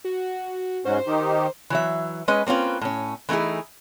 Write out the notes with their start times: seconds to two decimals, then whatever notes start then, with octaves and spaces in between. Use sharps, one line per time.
0.05 F#4
0.85 G#2 C#4 F#4 C5
1.07 D#3 D#4 G4
1.70 E3 F#3 E5
2.28 G#3 C#4 B4 D#5
2.47 A#3 C4 C#4 F4 B4
2.81 A2 C#4
3.29 E3 A3 D#4 E4 G#4